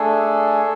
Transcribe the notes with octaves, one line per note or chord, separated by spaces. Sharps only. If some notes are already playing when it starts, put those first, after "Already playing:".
Already playing: A3 D4 G#4 A4